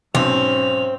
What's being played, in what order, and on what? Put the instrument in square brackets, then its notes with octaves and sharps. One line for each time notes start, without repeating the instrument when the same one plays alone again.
[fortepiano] B1 [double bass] G#2 C#4 [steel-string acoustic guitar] C4 [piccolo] F7